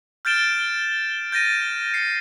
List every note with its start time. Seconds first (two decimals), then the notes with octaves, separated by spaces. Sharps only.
0.25 F6 G6 A6 D7 E7 G7
1.32 G6 A6 A#6 D#7
1.94 C7 C#7